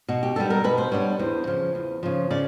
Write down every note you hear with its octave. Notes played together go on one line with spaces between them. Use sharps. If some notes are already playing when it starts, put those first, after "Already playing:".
B2 F#4
G4
G3 B3 D4 A4
A#4
B2 B4
C5
G3 B3 D4 C#5
E2 C5
C#3 F3
E2
C#3 F3
C#3 D5